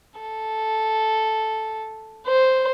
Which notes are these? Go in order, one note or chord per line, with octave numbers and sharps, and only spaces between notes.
A4
C5